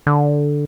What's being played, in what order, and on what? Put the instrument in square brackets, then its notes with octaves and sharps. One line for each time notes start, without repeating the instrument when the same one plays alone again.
[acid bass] D3